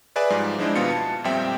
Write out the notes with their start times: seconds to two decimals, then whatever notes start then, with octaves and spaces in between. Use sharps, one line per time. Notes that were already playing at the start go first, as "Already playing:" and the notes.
0.16 G#4 B4 D5 E5 G#5 D6
0.30 G#2 F3 G3
0.58 F3 G#3 D4 E4 C5 D#5
0.76 D#2 B2 B3 F4 C#7
0.90 A5
1.24 F2 A#2 G3 C4 E5 G5